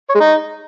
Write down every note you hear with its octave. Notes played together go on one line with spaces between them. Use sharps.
C#5
G#3
D#4